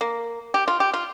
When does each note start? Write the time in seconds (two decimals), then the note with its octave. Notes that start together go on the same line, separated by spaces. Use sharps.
0.01 A#3
0.54 G4
0.68 F4
0.80 G4
0.94 F4